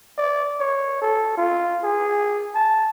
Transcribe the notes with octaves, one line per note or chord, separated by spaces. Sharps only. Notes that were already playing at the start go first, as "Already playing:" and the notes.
D5
C#5
A4
F4
G#4
A5